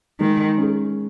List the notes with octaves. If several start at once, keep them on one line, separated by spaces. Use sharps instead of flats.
D#3 G#3
C#4 G#4